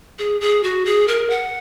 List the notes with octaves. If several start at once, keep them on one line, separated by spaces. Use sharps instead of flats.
G#4
G#4
F#4
G#4
A#4
F#5